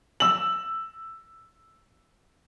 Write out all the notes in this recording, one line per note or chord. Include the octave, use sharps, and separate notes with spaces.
E6 F#7